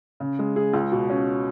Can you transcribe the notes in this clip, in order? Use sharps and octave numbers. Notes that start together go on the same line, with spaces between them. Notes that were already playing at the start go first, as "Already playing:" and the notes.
C#3
G#3
G#4
C#2
B2
C#4